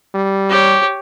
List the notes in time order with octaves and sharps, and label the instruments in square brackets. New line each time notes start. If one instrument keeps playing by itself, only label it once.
[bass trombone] G3
[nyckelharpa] G4 C#5